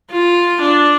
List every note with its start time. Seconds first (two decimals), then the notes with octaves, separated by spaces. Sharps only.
0.11 F4
0.61 D4